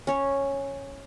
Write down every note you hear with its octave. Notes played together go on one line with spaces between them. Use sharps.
C#4 C#5